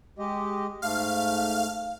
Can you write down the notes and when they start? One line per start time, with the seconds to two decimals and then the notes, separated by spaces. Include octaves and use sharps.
0.19 G#3 G4 D#5
0.82 G#2 A3 F5